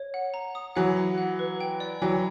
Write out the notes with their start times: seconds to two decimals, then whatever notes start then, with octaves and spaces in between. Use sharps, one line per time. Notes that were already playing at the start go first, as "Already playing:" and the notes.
Already playing: C#5
0.14 F#5
0.34 A#5
0.55 D#6
0.76 E3 F#3 F#5
0.97 A#5
1.18 F#5
1.39 B4
1.61 G5
1.80 D5
2.02 E3 F#3 G5